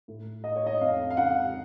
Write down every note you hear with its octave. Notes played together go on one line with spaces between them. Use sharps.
A2
D#5
C#5
D#5
F2 F5
F5
C#3 F#5